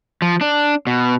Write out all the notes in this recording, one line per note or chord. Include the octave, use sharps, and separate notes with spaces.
F3
D4
B2